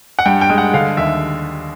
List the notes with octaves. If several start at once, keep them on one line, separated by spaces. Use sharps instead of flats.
F#5
G2 G5
G5
G#3
F#5
D3 F5
D#2 E5